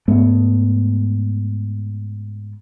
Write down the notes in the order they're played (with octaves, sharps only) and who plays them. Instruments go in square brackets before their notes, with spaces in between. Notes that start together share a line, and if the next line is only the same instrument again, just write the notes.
[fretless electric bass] G#2 A3 B3